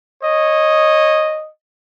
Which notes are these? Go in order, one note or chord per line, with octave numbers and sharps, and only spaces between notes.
C#5 D#5